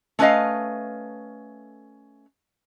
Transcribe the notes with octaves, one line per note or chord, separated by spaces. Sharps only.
A3 C#4 B4 C5 D#5 F5